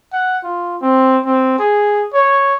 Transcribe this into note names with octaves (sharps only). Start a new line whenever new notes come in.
F#5
F4
C4
C4
G#4
C#5